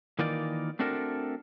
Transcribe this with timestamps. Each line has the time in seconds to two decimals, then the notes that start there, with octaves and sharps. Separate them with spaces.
0.19 D#3 E3 A#3 D#4 F4 D5
0.79 A3 C4 D4 F#4 A4 A#4